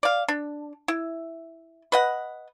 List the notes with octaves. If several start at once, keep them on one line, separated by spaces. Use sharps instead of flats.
D5 F5
D4
E4
B4 D#5 F#5